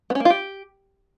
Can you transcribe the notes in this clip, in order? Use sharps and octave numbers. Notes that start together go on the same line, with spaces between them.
B3
C#4
A#3
F4
G4